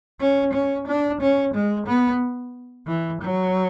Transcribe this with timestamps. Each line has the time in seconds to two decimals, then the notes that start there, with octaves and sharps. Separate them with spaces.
0.20 C#4
0.53 C#4
0.87 D4
1.21 C#4
1.54 G#3
1.87 B3
2.87 E3
3.21 F#3